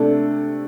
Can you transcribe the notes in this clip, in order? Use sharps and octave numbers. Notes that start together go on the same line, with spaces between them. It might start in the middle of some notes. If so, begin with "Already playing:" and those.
Already playing: C3 A3 D4 A4